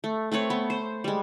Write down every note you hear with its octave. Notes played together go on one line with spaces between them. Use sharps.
A3
A3 C4 B4 C#5
B3
C5
G3 G#3